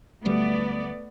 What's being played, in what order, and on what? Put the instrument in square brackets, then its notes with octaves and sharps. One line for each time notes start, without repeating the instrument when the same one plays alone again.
[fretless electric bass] D1 D2 G3 [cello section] A3 B3 D5